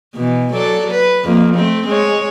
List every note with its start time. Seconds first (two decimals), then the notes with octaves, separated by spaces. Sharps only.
0.15 B2 E3
0.54 F#3 A4 D5
0.90 B4
1.24 F2 A#3
1.55 A3 C4
1.88 G#3 C#5